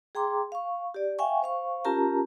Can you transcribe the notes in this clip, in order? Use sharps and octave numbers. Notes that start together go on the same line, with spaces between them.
G#4 G5 A#5 C6 D6
F5 C#6
G4 D5
E5 F5 G5 G#5 C#6
C5 F5 C#6
C#4 F4 G4 A#4 A5 A#5